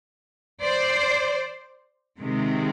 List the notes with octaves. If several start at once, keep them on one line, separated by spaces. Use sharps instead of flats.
C5 D5
C3 D#3 G#3